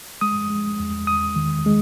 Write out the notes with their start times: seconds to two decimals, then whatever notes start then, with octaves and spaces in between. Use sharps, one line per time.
0.21 G#3 D#6
0.50 G#3
0.80 E2
1.07 E2 D#6
1.36 D#3
1.66 G#3